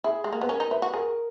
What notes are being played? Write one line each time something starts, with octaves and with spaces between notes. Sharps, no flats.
E4 G#4
G#3
A#3
B3 B4
C#4 A#4
D#4
E4 B4
F#4
G#4 A#4